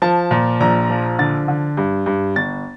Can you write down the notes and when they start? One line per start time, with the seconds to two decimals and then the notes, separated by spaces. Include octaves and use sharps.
0.02 F3 A5
0.31 A#2
0.60 A#1 A#5
0.90 F3
1.19 D3 A6
1.48 D3
1.77 G2
2.06 G2
2.36 G1 A6